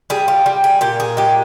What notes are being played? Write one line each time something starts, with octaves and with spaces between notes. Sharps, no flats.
G3 G#4
F4
G3
G#4
A#2 G4
G#4
G#3 G4